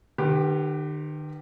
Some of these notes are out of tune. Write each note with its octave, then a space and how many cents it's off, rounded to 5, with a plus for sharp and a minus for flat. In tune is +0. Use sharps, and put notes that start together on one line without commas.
D#3 -45 G4 +0 B4 +0